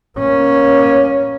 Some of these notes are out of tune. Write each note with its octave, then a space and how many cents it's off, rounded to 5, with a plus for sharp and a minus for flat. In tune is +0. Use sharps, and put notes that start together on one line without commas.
A#3 +20 C#4 +0